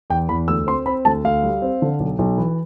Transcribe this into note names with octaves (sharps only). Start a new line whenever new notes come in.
E2 G5
E2 B5
D2 E6
C4 C6
C4 B5
D2 A5
D2 F5
G3
C4
D3
B1
B1
E3